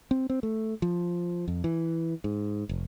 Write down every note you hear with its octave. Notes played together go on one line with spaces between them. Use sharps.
C4
C4
A3
F3
F2
E3
G#2
F1